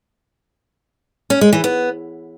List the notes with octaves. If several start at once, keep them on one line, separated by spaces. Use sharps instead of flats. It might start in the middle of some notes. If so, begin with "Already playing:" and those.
C#4
G#3
E3
B3